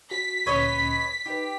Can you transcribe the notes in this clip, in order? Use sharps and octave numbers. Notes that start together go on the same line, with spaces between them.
F#4 B6
D2 A#2 C#4 B4 C#5 D#5
D#4 G4 B4